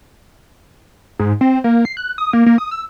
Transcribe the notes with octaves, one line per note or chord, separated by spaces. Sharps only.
G#2
C4
A#3
C7
F#6
D#6
A#3
A#3
D#6
E6